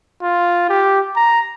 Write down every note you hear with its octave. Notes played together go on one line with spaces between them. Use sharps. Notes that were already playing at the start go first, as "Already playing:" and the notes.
F4
G4
A#5